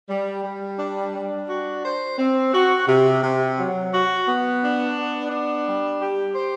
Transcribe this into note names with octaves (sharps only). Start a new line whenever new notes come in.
G3
G3
D4
D4
F#4
C5
C4
F#4
C3
C3
F#3
F#4
B3
D4
B3
D4
G3
G4
C5